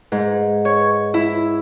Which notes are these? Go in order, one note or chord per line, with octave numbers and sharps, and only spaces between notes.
G#2
C#5
E4